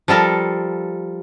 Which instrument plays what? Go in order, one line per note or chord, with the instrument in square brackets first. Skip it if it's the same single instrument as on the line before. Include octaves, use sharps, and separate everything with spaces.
[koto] F3 G3 A4 A#4